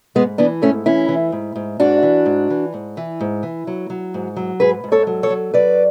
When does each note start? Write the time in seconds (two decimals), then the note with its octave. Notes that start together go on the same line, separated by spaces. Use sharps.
0.15 G#2 G#3 B3
0.38 E3 B3 D4
0.62 G#2 A3 C#4
0.86 E3 C#4 E4
1.08 E3
1.32 G#2
1.56 G#2
1.80 G#2 D4 F#4
2.03 E3
2.26 G#2
2.50 E3
2.74 G#2
2.97 E3
3.20 G#2
3.43 E3
3.67 F#3
3.90 F#3
4.14 G#2
4.36 F#3
4.60 G#2 G#4 B4
4.84 G#2
4.92 A4 C#5
5.07 F#3
5.23 A4 C#5
5.30 F#3
5.54 F#3 B4 D5